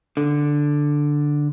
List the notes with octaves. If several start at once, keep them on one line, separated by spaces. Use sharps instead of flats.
D3